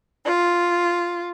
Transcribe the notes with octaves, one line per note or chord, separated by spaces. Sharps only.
F4